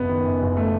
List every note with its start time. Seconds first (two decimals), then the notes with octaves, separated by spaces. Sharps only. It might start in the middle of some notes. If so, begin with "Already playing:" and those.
Already playing: F#1 B3
0.09 D#3
0.25 F#2
0.42 F#1
0.57 A3